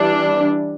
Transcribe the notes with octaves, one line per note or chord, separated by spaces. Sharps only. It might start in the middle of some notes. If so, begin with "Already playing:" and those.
Already playing: E3 G3 D4